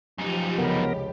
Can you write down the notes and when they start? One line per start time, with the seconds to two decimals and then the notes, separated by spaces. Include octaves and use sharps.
0.19 F#2 F3 D#4 G4
0.58 F1 C#2 B3 A#4 B5